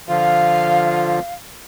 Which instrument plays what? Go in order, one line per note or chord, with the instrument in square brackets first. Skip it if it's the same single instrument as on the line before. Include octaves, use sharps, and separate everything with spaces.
[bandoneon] D3 F3 F4 [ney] F5